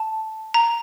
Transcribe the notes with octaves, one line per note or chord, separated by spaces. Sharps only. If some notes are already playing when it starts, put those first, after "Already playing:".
Already playing: A5
A#5